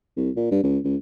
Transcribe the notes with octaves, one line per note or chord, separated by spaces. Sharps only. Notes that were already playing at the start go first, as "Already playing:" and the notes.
C2
A#2
G2
C#2
C#2